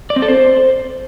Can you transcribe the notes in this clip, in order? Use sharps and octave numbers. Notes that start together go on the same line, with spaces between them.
D5
C4
A4
C5